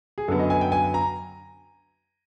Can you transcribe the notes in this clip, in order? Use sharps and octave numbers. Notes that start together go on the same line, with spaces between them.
G#4
F#2 D3 F#3 B3 A4
D#5
G#5
G5
G#5
A#5